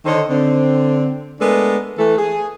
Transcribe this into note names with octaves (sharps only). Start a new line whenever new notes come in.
D3 D#3 A4 C5 C#5 D#5
D3 C4
G#3 A3 B3 D4 A4 A#4
E3 A3 A4
G#4